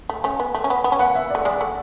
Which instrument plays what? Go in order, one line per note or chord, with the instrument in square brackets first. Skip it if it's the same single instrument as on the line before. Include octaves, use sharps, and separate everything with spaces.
[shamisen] A3
A3 C#4
B3
A3
C#4
B3
B3
C#4
[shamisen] B3 [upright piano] F#5
[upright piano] E5
D5
[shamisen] A3
[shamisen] G#3 [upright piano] D5
[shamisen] A3